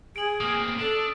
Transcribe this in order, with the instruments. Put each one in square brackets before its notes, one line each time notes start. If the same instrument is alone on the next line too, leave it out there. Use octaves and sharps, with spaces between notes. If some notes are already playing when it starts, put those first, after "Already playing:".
[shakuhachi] G#4 [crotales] D7 F#7
[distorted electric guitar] A#3 C4 [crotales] D#6
[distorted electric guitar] D4 [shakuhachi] A4